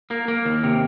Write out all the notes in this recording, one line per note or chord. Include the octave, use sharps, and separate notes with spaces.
A#3
A#3
D#2
C3